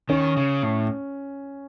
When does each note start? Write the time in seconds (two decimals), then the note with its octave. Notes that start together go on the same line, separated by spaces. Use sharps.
0.09 D#3 C#4
0.37 C#3
0.63 A2